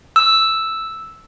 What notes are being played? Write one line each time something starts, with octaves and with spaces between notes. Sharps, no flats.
E6